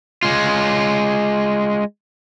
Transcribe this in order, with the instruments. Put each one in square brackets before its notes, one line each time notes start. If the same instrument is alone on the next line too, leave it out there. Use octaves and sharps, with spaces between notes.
[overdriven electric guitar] G#3 F4